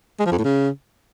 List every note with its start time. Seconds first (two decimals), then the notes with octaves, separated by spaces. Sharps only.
0.19 G#3
0.25 F3
0.32 F2
0.38 A2
0.44 C#3